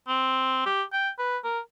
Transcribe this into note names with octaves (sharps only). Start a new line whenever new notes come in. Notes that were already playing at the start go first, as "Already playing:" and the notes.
C4
G4
G5
B4
A#4